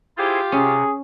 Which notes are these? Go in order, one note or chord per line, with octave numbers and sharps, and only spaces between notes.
E4 F4 G4 G#4 C5
C3 C#4 G#4